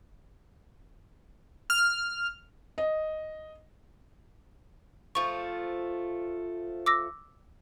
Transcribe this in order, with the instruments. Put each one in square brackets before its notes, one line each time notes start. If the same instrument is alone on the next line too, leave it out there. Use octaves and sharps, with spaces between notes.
[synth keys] F6
[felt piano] D#5
[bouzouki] F3 A3 [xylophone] C#6
[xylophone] D6 E6 A#6